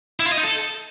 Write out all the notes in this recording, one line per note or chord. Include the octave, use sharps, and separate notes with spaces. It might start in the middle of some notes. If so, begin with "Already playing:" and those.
E4
F4
D#5
D#4
A4